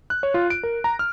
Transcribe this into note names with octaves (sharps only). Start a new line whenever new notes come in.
F#6
C#5
F4
D7
A#4
A#5
F6